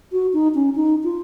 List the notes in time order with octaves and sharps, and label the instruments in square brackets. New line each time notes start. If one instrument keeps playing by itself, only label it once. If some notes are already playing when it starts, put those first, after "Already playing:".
[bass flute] F#4
D#4
C#4
D#4
F4